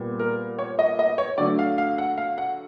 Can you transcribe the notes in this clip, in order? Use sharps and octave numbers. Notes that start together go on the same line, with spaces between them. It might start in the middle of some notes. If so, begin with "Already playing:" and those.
Already playing: A#2 G3 B3
A#4
C#5
D#5
D#5
C#5
D3 F#3 A3 D5
F5
F5
F#5
F5
F#5